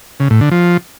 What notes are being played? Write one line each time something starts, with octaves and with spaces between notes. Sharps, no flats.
C#3
A2
D3
F3